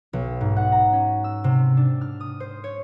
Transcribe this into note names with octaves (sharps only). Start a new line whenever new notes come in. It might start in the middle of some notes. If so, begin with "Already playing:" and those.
B1
G#2
F#5
A#5
C#4
E6
C3
D4
F6
D#6
C5
C#5